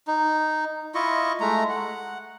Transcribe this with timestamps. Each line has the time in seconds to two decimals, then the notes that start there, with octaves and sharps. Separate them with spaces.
0.08 D#4
0.95 E4 F4 D#5 C#6
1.41 G#3 A3 A#5
1.69 F#5